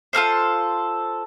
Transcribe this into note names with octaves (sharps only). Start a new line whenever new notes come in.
F4 A4 A#4 C5